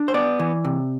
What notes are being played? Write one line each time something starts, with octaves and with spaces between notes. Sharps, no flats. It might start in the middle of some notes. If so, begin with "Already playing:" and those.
Already playing: D4
C5
B3 D5
E3
C3